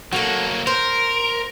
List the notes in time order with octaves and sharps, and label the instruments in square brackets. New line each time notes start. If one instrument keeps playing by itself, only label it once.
[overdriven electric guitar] F#3 A#3 [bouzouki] A3 F#4
[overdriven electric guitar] A#4 [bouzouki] C5